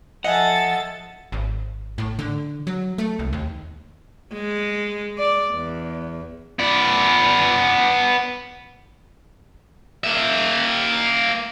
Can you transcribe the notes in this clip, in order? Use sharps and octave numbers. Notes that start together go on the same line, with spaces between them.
F3 A4 D#5 E5 F#5 G#5 A6
G#1
A2
D3
F#3
A3
C2
D#2
G#3
D5
E2
B3 D5
A#3 E5